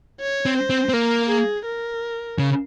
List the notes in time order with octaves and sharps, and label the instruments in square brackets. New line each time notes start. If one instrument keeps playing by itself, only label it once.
[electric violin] C#5
[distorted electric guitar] C4
[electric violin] C5
[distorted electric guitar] C4
C4
[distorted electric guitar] A#3 [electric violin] A#4
[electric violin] G#4
A#4
[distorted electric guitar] C#3